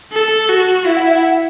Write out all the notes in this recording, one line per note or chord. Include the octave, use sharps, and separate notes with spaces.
A4
F#4
E4 E5
F#5
E5
F#5